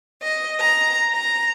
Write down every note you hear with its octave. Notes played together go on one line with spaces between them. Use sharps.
D#5
A#5
A#5